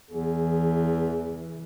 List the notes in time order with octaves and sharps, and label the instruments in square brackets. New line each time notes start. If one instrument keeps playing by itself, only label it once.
[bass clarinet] E2 [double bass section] E3 [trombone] G#4